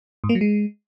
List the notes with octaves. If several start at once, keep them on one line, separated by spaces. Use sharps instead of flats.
G#2
A#3
F#3
G#3